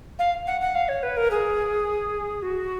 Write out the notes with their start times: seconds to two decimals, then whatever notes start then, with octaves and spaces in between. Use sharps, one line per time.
0.19 F5
0.47 F#5
0.61 F#5
0.75 F5
0.89 C#5
1.03 B4
1.17 A#4
1.31 G#4
2.42 F#4